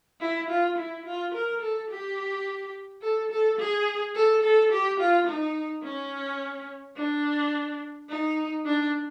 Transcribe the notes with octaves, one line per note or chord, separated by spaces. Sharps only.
E4
F4
E4
F4
A#4
A4
G4
A4
A4
G#4
A4
A4
G4
F4
D#4
C#4
D4
D#4
D4